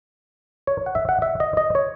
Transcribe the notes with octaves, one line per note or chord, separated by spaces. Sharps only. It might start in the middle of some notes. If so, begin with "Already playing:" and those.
C#5
F#5
E5
F#5
E5
D#5
D#5
C#5